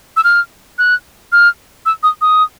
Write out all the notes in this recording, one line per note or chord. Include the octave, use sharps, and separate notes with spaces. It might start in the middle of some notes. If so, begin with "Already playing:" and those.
E6
F6
F#6
F6
E6
D#6
D#6